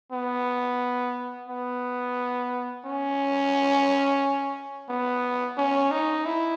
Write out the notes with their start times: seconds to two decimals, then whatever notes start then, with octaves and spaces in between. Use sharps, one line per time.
0.12 B3
1.49 B3
2.85 C#4
4.89 B3
5.58 C#4
5.92 D#4
6.26 E4